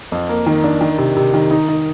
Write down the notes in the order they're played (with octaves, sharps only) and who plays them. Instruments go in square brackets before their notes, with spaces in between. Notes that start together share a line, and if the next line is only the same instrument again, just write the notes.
[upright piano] F2
A#3
D#3
D4
D#3
C3
C3
D#3
D#4
D#4